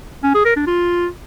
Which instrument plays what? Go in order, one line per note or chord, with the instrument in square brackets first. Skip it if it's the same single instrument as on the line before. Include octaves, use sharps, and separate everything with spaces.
[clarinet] C#4
G#4
A#4
D4
F4